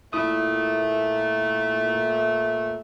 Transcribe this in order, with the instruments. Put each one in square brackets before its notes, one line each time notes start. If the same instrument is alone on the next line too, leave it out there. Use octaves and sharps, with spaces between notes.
[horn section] A#2 A3 [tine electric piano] E4 D#6